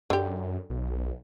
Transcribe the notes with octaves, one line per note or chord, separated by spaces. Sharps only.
F#2 D3 G4
B1